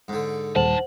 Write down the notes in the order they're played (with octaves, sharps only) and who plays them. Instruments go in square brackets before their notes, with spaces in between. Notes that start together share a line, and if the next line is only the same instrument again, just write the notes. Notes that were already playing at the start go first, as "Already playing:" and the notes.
[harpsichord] G#2 D3
[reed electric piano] D#2 A#2 G3 [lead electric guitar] D#3 A5 [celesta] C5 F#5 F#7